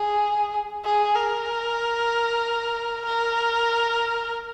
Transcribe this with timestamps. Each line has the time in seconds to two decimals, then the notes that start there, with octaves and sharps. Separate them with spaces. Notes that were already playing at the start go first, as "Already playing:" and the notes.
Already playing: G#4
0.85 G#4
1.16 A#4
3.06 A#4